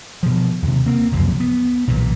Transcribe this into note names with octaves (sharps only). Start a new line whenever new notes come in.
B2 F3
D#2 C3
A#3 C4
F1 C#2 F#2 F3
B3
B1 A#2 E3